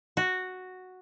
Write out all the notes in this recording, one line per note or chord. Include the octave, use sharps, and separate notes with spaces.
F#4